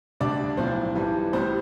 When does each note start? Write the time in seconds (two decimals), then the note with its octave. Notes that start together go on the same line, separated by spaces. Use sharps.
0.20 D2 D3 G3 D4 D5
0.57 B1 A2 F3 C5
0.95 G2 E3 G3
1.33 A1 A2 G3 C5